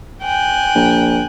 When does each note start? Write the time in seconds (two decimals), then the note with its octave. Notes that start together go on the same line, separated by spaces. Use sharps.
0.22 G5 G#5 F#6
0.75 A#1